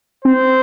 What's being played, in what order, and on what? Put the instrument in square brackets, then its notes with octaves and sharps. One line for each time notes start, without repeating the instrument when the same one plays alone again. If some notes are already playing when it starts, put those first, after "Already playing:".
[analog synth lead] C4 [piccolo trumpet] C5